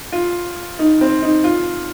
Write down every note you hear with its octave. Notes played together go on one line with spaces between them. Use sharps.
F4
D#4
C4
D#4
F4